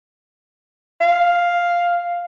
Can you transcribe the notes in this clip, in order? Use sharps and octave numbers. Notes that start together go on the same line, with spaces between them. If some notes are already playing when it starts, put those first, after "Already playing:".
F5